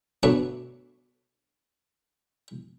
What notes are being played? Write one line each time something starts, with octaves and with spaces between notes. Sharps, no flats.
F#3 A3 B3 D4 F#4 D5